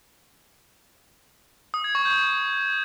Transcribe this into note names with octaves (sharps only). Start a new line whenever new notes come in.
D#6
G#6
C#6
G6